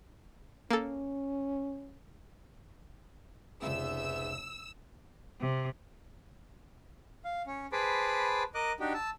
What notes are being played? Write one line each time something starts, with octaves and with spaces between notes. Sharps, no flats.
A#3 C#4 A4
F1 C#2 G#2 B3 E5 E6
C3
F5
C#4
G#4 B4 C5 A5 B5 D6
A#4 D#5 D6 F#6
D4 D#4 F#4 G4
A5 E6